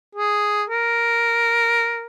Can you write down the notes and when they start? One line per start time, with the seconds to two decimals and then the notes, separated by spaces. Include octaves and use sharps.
0.15 G#4
0.70 A#4